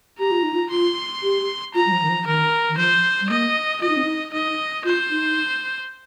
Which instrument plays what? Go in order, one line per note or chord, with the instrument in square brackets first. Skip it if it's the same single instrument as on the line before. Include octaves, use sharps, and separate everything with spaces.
[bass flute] G4 [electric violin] A#5
[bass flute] F4
D#4
F4
[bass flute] F4 [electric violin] C6
[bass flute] G4
[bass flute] F4 [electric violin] A#5
[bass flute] G3
F3
D#3
F3
[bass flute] D#3 [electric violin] A#4
[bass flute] D#3
[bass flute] F3 [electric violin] C5
[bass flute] G3
[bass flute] A#3 [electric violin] D#5
[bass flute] F4 [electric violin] D#5
[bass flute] D#4
C4
D#4
[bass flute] D#4 [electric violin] D#5
[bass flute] F4 [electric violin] C5
[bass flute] D#4